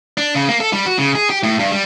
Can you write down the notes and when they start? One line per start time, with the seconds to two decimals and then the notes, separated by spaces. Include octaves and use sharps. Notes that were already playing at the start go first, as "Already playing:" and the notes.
0.17 D4
0.35 C#3
0.49 A#3
0.60 A4
0.73 G3
0.86 F#4
0.98 C#3
1.15 G#4
1.30 G4
1.43 A2
1.59 G2
1.72 G3